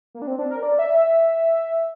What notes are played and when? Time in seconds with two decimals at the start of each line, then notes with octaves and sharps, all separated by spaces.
0.15 A#3
0.22 D4
0.27 C4
0.39 D4
0.51 A#4
0.63 D5
0.79 E5
0.94 E5